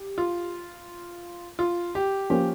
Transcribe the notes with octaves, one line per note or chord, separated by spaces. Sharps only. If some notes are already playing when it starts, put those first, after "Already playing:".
Already playing: G4
F4
F4
G4
F3 A#3 C#4 G4